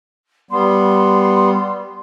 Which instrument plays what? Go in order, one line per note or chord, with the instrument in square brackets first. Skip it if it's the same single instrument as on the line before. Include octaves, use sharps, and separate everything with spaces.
[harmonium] G3 B3 [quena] C6